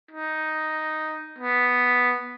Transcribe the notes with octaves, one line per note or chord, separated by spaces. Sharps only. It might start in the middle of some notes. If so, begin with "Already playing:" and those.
D#4
B3